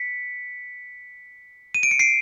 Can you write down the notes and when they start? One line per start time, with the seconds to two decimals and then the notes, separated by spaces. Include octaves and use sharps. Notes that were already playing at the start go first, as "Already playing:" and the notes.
Already playing: B6 C#7
1.75 D#7
1.83 D7
1.91 C#7
1.99 C7 D7